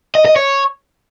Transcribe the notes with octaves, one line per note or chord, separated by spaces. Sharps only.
D#5
D#5
C#5